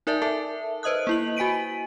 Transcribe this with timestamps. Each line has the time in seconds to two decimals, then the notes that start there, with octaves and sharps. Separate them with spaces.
0.07 D#4 A#4 D5 E5 A5
0.22 A4 E5 A5
0.83 B4 C5 D#5 D#6 F#6
1.07 A#3 E4 F#7
1.37 F#4 G#5 B6 D7 D#7